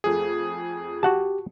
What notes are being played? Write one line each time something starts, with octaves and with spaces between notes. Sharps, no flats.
F2 A3 G#4
F#4 G4 F#5 A5